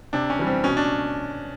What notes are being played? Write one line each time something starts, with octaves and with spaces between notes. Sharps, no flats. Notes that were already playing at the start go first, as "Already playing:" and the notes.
C3 D4
C#4
E3 G3
C4
B2 C#4
D4